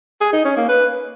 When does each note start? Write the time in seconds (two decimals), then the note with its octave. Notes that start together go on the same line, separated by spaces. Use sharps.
0.21 G#4
0.33 D#4
0.45 C#4
0.57 A#3
0.69 B4